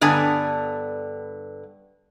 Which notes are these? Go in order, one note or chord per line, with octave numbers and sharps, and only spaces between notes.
G2 D3 B3 G#5 A5